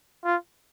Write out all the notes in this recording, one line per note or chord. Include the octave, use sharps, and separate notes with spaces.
F4